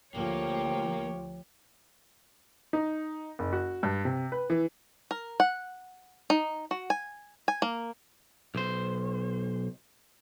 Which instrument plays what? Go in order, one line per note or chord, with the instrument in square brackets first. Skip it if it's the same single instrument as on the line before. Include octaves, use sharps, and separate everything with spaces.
[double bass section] D2 F3 [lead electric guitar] A#3 [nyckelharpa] G4 G5 [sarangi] C#5
[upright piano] D#4
F#1
F#4
G2
C3
B4
E3
[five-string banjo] A#4
F#5
D#4
F#4
G#5
G#5
A#3
[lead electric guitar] B1 C5